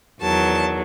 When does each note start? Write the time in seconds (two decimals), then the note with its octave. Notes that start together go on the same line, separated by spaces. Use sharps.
0.21 E2 D#3 F#3 A5